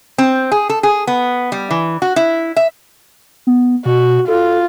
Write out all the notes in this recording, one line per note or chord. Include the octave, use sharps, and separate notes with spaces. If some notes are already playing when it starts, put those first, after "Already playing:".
C4
G#4
A4
G#4
B3
G3
E3
F#4
E4
E5
B3
B2 F#4
F4 A4